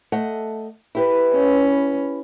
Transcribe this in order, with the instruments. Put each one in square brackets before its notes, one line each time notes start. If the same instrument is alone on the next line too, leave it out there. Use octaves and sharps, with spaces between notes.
[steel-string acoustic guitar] A3 D#5 F#5
E4 G4 B4
[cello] C#4